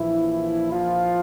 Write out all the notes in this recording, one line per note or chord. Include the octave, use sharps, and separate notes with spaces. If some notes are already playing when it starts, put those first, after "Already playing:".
Already playing: A#1 A#2 E3 F3 E4
F3 F4